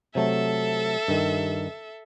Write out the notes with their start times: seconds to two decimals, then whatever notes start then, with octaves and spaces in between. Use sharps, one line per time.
0.15 C3 F#3 A3 A4 E5
1.08 G2 D#3